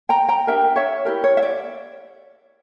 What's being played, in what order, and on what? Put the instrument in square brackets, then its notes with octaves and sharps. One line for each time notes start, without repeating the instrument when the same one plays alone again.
[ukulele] G5 A#5
G5 A#5
D4 G4 A#4 E5 G5
C#5 E5
E4 G4 A#4
C#5
E5
D5